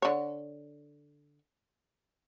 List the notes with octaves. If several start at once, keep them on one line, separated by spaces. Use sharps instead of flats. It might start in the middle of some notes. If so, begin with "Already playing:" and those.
D3 C#5